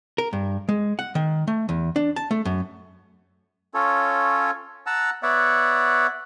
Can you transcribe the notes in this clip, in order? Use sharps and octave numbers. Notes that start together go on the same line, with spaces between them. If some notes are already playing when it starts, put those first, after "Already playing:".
A#4
G2
G#3
F#5
D#3
A3
E2
D4
A5
A3
F#2
C#4 F4 A4 C#5
F#5 A5 A#5 E6
B3 C#5 D5 E5 F#5